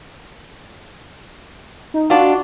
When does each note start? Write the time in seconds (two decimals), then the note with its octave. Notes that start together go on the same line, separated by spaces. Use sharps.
1.94 D#4
2.10 D4 F4 F#4